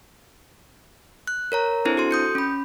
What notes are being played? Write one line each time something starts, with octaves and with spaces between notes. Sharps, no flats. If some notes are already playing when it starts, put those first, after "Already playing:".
F#6
A#4 C#5 A#5
C4 D4 E4 A4 C5
F#4 A4 C6
D#6 G6 C#7
C#4 B5